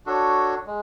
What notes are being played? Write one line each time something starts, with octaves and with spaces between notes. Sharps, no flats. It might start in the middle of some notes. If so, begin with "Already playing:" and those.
D4 F#4 A4 C#5
G#3